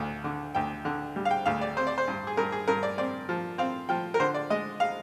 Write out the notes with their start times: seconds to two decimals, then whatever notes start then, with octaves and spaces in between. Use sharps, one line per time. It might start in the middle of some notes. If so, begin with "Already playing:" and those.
Already playing: D2
0.24 D3
0.55 D2 G5
0.85 D3
1.16 G3
1.25 F5
1.31 G5
1.46 D2 F5
1.61 D5
1.77 C4 C5
1.87 D5
1.98 C5
2.08 G2
2.27 G#4
2.37 G2 A#4
2.52 G#4
2.68 G2 A#4
2.83 D5
2.98 C4 D5
3.29 F3
3.58 C4 F5
3.89 F3 G5
4.14 A#4
4.20 D3 C5
4.34 D5
4.50 G#3 D#5
4.80 F5